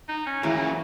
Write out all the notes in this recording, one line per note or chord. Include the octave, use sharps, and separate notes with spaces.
D#4
C#4
A#2 C#3 E3 F#3 A#3